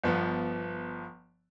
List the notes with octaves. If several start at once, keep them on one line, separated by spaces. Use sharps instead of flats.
G1 F3 B3